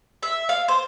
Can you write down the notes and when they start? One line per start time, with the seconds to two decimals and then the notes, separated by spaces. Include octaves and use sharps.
0.23 E5
0.49 F5
0.68 C5